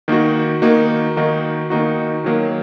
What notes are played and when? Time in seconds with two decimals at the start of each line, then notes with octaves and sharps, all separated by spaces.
0.08 D#3 A#3 D#4 F#4
0.62 D#3 A#3 D#4 F#4
1.17 D#3 A#3 D#4 F#4
1.70 D#3 A#3 D#4 F#4
2.24 D#3 F#3 A#3